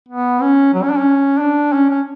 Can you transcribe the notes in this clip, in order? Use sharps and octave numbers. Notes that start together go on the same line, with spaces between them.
B3
C#4
F#3
C#4
D4
C#4
D4
C#4
C#4